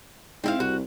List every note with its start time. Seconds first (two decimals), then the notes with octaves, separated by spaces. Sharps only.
0.44 G#2 C4 E4 F5
0.60 C2 F#4